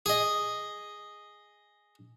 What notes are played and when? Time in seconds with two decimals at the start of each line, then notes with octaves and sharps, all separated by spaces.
0.06 G#4 D#5